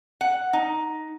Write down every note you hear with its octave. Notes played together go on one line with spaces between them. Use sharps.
F#5
D#4